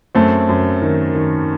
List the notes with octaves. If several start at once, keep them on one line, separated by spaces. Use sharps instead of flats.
F#2 A3 C4
F#2
D#3
D#3